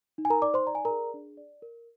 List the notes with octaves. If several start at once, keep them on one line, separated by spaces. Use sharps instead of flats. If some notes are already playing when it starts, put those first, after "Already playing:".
D#4
G#5
A#4 A#5
D#4 D5 D6
C5 C6
D5 A#5
G#5
A#4 A#5
G#4
D4
D5
A#4